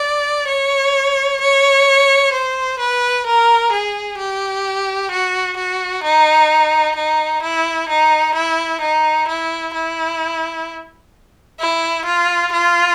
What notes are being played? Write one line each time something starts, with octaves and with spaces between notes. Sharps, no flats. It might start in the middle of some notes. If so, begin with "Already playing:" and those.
Already playing: D5
C#5
C#5
C5
B4
A#4
G#4
G4
F#4
F#4
D#4
D#4
E4
D#4
E4
D#4
E4
E4
E4
F4
F4